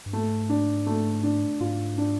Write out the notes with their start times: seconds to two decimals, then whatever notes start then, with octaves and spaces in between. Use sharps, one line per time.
0.06 G2
0.13 G#2 A3
0.49 D4
0.86 A3
1.23 D4
1.60 G#2 F4
1.98 D4